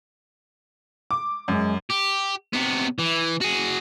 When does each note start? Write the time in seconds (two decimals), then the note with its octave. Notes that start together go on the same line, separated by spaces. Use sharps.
1.11 D6
1.48 F#2 G#3
1.90 G4
2.53 C3 B3
2.99 E3
3.41 F#4 G#4